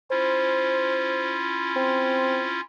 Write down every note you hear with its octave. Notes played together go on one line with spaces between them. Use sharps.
C#4 E4 F4 C5
C4